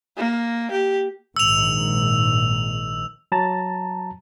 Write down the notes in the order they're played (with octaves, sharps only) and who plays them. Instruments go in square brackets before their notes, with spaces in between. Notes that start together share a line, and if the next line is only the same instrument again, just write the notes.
[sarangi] A#3
G4
[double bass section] A#1 G#2 D#3 [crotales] E6 F7
[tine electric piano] F#3 A5 A#5 A6